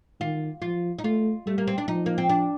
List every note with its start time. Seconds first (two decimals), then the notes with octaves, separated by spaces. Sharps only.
0.20 D#3 F4
0.62 F3 F4
0.98 D#4
1.04 A3 F4
1.46 G3 A3
1.58 A#3
1.67 C4
1.78 D4
1.88 F3 D#4
2.06 A#3
2.18 C4
2.29 D4